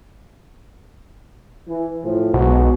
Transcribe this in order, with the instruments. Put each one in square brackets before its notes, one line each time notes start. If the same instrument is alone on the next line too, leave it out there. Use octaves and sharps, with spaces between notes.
[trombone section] E3
A2 F3
[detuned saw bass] B1 [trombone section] G#3 B3 F#4